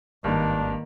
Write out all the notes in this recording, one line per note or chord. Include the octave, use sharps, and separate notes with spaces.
G#1 G2 D#3 A#3 D4